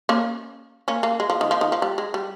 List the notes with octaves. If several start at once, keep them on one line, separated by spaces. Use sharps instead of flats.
A#3 C#4
A#3 C#4
A#3
G#3
F3
D#3
F3
D#3
F3
G3
G#3
G3